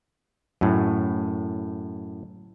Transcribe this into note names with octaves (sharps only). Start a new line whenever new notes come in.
F#2 A2